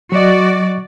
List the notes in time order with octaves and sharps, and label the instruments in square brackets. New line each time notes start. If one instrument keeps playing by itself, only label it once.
[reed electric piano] F#3 D#5 [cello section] F#4 D5